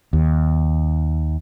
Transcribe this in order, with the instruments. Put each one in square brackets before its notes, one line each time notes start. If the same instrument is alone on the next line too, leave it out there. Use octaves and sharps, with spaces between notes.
[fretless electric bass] D#2